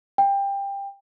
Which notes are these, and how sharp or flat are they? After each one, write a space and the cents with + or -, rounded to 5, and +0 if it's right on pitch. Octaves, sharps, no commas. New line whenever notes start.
G5 +20